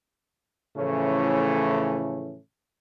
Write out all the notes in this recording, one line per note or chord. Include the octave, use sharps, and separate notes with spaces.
A2 C#3 E3 F3 A3 C#4